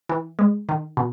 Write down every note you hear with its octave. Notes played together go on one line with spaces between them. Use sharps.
E3
G#3
D#3
B2